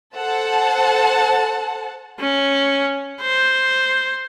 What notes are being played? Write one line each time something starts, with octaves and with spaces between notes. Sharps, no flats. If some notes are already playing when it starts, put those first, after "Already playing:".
A4 C5 F#5 A5
C#4
C5